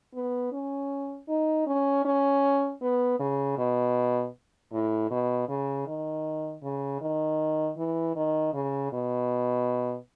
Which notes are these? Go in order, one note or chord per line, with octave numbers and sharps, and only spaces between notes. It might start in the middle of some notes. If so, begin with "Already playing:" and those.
B3
C#4
D#4
C#4
C#4
B3
C#3
B2
A2
B2
C#3
D#3
C#3
D#3
E3
D#3
C#3
B2